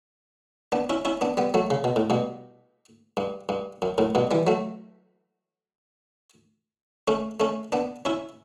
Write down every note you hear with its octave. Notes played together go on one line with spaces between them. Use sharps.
B3 D4
C#4 E4
C#4 E4
B3 D4
G3 B3
F#3 A3
C#3
B2
A2
G2 B2
G2
G2
F#2
F#2 A2
G2 B2
E3 G3
F#3 A3
A3 C#4
A3 C#4
B3 D4
C#4 E4